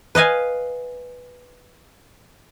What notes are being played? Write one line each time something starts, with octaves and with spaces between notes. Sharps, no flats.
B4 D#5 F5 G#5